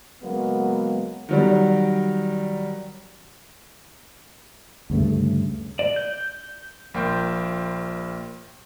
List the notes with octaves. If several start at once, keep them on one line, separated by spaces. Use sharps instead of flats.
C#3 F#3 G#3 A#3 B3
D#3 F#3 G3
D2 G2 C#3 A3
D5
G6
A#1 A#3 G5 C6 G6